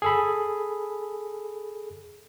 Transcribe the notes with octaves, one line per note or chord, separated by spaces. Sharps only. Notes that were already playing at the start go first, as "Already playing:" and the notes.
G#4 A4 B5